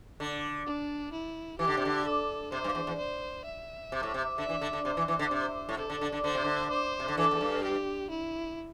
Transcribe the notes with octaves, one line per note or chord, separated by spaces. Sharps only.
D3
D4
E4
E3 G4
D3
C3
D3
A4
C3 C5
G2
E2
E2
C5
E5
C3
A2
C3
D3 E5
E3
D3
D3
C3 C5
E3
E3
D3
C3
A2
C3 A4
D3
D3
D3
D3 C5
C3
D3
C5
C3
D3
E3 A4
E2
G2
G4
E4